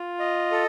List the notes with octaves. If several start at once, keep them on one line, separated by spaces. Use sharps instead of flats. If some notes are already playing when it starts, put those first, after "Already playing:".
Already playing: F4
D#5
A4